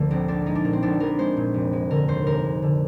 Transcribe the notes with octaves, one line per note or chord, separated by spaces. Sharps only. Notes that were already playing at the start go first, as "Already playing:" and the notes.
Already playing: D2 D3 F3 A#3
A#1 C4
A#1 D4
G#3 D#4
D4
A#2 A#3
C4
A#1 D4
A#1 A#4
G#3 C5
A#2
F1
G#3
D3 A#4
D#2 C5
F1 A#4
G#3
D3